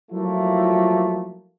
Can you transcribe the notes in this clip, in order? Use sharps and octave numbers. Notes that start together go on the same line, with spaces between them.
F3 F#3 A3 A#3 E4 F4